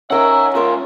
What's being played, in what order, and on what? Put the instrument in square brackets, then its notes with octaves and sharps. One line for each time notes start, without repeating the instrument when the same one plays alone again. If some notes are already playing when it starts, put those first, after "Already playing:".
[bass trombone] C#4 [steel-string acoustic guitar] D#4 A#4 [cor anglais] E5 [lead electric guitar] F#5 A#5
[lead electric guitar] G#2 C#3 [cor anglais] F4 [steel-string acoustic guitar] A#4 E5